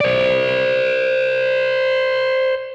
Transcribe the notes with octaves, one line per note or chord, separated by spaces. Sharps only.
C5 D5